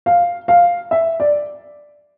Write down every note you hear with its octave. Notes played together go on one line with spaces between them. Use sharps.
F5
F5
E5
D5